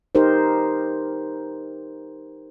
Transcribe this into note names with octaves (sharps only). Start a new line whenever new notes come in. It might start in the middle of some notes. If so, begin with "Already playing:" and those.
D#4 G4 A#4 C5